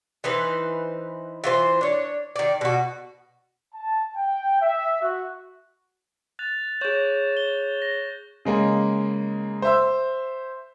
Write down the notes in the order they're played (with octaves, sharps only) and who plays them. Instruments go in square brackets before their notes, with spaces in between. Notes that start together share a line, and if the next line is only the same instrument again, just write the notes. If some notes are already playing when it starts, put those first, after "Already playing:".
[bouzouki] E3 D#4 B4 C5
E3 F4 C5
D4 C#5
D#3 D5
B2 F#4
[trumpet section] A5
G5
E5
F#4
[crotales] F#6 A6 F7
[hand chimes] G#4 C#5 [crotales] C#6 G6 E7
[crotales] E7 G7
A#6
[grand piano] C#3 G#3 A#3
C5 E5 E6